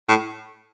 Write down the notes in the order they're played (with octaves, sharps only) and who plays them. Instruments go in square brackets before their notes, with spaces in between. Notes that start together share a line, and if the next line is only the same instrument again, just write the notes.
[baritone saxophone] A2